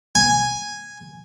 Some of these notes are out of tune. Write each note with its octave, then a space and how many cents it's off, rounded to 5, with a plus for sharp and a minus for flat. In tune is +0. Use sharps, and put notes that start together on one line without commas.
G#5 -5